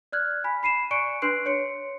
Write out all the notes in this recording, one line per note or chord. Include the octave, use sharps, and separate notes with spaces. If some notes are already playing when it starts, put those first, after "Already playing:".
D5 F6 F#6 G#6
G#5 B5 B6
B5 C7 D#7 E7
D5 G#5 C#6 F#6 C#7 D7
D4 B4 C6 F#6 C7 D7
C#5 C6 C#7